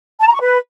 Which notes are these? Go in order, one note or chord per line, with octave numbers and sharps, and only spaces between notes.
A5
A#5
C#6
B4